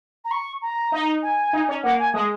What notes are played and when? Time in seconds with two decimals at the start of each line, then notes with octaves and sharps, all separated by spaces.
0.25 A#5
0.31 C#6
0.62 A#5
0.92 D#4
1.23 G#5
1.53 D#4
1.68 C#4
1.83 A#3 F#5
1.99 G#5
2.14 G#3 D#6